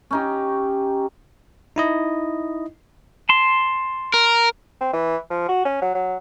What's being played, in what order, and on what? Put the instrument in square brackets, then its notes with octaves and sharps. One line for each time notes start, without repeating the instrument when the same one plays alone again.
[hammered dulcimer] C#4 D#4 G4
[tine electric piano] D#4 E4 D#5
[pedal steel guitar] A5 C6
[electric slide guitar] A#4
[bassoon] C4
E3
F3
F#4
C#4
F#3
F#3